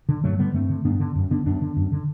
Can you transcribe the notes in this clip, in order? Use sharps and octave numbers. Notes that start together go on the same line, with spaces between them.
D3
G2 F#3 A3
D3 G3 B3
G2 A3 C4
D3
G2 B3 D4
D3
F#2
D3 B3 D4
F#2 B3 D4
D3
F#2
D3